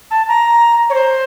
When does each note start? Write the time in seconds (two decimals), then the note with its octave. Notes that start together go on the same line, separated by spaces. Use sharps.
0.10 A5
0.28 A#5
0.89 C#5
0.93 C5